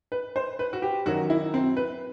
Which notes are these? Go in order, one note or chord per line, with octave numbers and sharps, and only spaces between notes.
B4
C5
B4
F#4
G4
F#2 D#3 F#3 F#4
E4
C4
B4